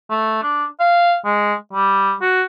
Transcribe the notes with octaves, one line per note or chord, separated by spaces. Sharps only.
A3
D4
F5
G#3
G3
F#4